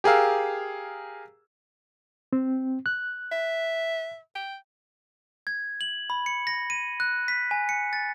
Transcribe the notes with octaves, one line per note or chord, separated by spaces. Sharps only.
G4 G#4 A#4 F5 E6
C4
F#6
E5
G5
G#6
F#7
B5
C#7
A#6
D#7
F#6
B6
G#5
C#7
A6